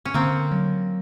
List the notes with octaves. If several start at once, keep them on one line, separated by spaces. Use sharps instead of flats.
C#4
D3 A#3 C4
F#3